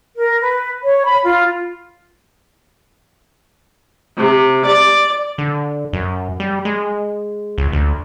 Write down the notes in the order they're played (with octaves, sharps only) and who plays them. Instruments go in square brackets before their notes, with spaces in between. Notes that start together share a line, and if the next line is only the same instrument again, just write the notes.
[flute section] A#4
B4
C#5
B5
F4
[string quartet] C3
D5
[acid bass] D3
F#2
G3
G#3
C#2
D2